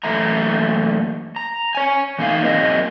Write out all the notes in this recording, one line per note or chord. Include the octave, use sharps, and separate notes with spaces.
F#2 E3 A3 A#3 E5 A#5
A#5
C#5 G#5
E3 A3 A#3 D#4 F5
F#3 A#3 C4 A#4 D5 D#5